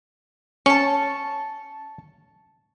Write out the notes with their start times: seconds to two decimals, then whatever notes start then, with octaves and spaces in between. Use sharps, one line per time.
0.66 C#4 A5 C#6